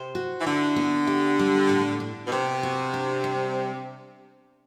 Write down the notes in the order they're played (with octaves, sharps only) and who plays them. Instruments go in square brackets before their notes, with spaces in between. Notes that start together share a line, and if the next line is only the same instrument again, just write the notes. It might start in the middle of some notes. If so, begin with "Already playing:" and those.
Already playing: [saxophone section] C3 [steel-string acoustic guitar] C5
[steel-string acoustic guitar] F#4
[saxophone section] E3
[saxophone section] D3 [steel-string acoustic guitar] E4
[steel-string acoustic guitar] B3
G4
G3
A2
D4
[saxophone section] B2
[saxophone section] C3 [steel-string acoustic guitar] B3
[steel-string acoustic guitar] F#4
D4
G3